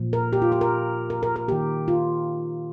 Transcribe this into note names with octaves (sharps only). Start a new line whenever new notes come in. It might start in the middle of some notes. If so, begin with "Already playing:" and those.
Already playing: A#2 F3 A#3
A#4
G4
F4
G4
A#4
A#4
A#4
A#4
D#3 A#3 G4
F4